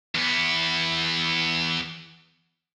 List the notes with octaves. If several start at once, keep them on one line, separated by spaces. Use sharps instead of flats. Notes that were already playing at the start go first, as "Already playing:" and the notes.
E2 B3